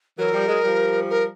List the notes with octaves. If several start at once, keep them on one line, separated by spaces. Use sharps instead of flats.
E3 F#3 A#4
F3 G3
F#3 G#3
F3 G3
A#4